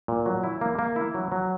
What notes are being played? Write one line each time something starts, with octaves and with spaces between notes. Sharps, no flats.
A#2
F#3
E4
A#3
A#3
E4
F#3
F#3